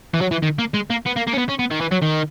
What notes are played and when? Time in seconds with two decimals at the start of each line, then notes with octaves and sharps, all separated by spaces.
0.14 E3
0.21 F#3
0.31 E3
0.43 D#3
0.59 A#3
0.74 G#3
0.90 A#3
1.06 B3
1.17 A#3
1.28 A#3
1.33 C#4
1.38 B3
1.49 C#4
1.59 B3
1.71 D#3
1.81 E3
1.91 F#3
2.02 D#3